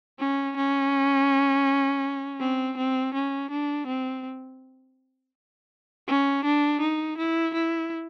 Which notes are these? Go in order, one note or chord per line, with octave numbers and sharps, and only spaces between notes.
C#4
C#4
C4
C4
C#4
D4
C4
C#4
D4
D#4
E4
E4